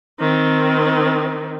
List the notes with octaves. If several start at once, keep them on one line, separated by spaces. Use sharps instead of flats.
D#3 C4